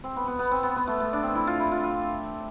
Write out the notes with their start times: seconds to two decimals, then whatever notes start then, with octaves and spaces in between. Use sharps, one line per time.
0.04 C4
0.16 B3
0.27 B3
0.39 B3
0.51 C4
0.63 B3
0.76 B3
0.87 A3
1.00 A3
1.13 D4
1.23 C4
1.35 E4
1.47 F4
1.60 E4
1.72 F4
1.83 F4